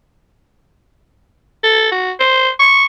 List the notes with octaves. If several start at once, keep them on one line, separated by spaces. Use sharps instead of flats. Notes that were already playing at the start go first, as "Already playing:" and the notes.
A4
F#4
C5
C#6